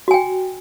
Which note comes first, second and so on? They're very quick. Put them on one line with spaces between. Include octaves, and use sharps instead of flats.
F#4 G#5 G5